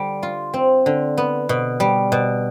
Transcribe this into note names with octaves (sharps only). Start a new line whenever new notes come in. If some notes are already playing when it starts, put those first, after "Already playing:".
Already playing: D3 G3
F4
C4
D3
B3
B2
G3
B2